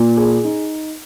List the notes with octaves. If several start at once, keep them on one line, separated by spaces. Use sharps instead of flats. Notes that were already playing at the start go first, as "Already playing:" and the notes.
Already playing: A#2
G#4
D#4